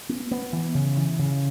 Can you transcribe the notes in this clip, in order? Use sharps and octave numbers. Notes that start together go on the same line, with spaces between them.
B3
B3
E3
C#3
E3
C#3